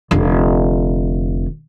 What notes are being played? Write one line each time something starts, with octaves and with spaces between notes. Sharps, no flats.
F1 D3